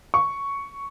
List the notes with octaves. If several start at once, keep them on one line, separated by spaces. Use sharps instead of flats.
C#6